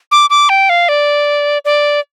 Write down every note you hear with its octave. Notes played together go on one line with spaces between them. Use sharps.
D6
D6
G5
F5
D5
D5